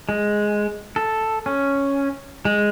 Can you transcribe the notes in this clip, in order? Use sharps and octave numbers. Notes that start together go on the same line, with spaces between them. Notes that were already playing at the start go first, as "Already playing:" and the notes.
G#3
A4
C#4
G#3